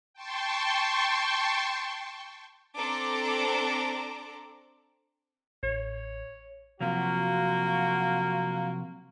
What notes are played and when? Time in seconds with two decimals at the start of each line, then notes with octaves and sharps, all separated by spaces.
0.14 G5 A5 C6 C#6
2.76 C4 D4 A4 A#5 D6
5.63 A1 C#5
6.81 C3 F3 F#3 A#3 F4 F#4